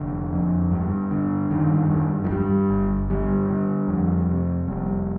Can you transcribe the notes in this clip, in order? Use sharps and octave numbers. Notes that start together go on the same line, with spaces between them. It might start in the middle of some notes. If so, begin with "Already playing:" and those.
Already playing: F1 D3
F2
G2
D3
G2 D#3
G2
F3
G2 G3
G1
D3 G3
D3
F2
C3
F1 G3